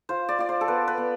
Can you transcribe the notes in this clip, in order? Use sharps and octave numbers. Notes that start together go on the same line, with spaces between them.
F4 C5
D5
F4 D5
C5
A4
B3 B4
B4
B3